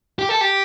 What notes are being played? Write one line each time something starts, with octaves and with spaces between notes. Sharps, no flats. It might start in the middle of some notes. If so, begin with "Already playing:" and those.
G4
A4
G4